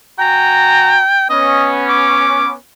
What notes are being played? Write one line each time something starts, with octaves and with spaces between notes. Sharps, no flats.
F#4 G5 G#5 A#5
B3 C#4 D#5
D6